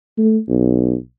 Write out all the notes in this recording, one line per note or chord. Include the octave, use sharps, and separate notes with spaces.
A3
B1